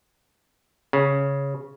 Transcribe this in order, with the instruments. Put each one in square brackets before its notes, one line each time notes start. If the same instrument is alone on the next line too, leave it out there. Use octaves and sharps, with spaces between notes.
[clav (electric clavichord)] C#3